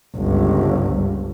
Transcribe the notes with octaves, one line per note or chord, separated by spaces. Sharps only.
G1 C#2